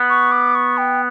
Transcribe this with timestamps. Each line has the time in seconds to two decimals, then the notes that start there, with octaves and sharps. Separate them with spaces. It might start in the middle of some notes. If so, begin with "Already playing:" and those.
Already playing: B3
0.10 C#6
0.32 D6
0.55 C#6
0.78 G5